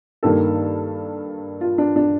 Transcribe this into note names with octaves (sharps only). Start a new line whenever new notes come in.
G2 D#3 A#3 A4
F4
D4
D4